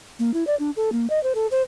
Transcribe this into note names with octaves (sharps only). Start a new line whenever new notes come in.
A#3
E4
D5
D4
A4
A#3
D#5
C5
A4
C5